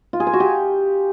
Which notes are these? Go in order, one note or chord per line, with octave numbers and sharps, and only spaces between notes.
F4
G#4
G#5
F#4
G4